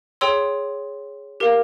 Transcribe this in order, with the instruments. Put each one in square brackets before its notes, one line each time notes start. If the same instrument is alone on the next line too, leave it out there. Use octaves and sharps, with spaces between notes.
[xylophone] G#4 C#5 G5 C6 E6
G4 A#4 F5